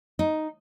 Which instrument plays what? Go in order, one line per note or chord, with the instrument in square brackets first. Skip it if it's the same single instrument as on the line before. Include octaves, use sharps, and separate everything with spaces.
[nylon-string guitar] D#4